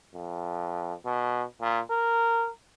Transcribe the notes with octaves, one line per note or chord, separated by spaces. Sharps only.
F2
B2
A#2
A#4